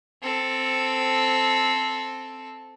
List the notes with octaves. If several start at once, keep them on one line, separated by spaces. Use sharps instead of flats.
C4 A4